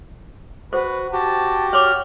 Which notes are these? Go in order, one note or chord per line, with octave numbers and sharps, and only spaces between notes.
F#4 B4 C5
F#4 G4 A5
C#5 D6 F6